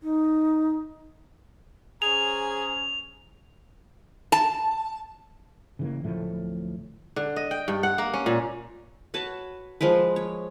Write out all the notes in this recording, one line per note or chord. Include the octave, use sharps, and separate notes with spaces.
D#4
C#4 G#4 C5 A#5 F7
A5
C#3 E3 A#3
D1 A2 F3 A3
D3
D#5
G5
G2
F#5
A#3
C#4
A#2
F#4 B4 C#5 A5
F3 G#3 A#4 B4
C#5